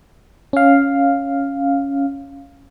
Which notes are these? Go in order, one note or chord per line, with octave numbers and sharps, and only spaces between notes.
C#4 F5